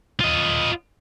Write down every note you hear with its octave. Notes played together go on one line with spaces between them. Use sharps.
F4 D#5